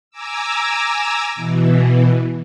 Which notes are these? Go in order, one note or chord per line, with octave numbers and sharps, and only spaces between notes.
G#5 A#5 D6 E6
B2 E3